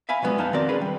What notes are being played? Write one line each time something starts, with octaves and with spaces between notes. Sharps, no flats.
E5 F5 G#5 B5
F3 F#3 G#3 B3 D4
F2 D#4 F5 A5
D#3 C4 F#4 A#4 D5
C#4 D4 G#4 A#4 B4
G3